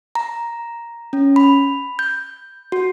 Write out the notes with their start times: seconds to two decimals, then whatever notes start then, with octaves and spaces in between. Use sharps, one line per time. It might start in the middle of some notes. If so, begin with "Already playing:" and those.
0.15 A#5
1.13 C#4
1.36 B5
1.99 G6
2.72 F#4